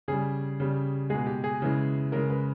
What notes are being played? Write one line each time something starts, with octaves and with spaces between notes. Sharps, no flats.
C#3 G3 G#4
C#3 G3
B2 G#3 G#4
G4
G#4
C#3 E3 G#3
C#3 G#3 A#4
B4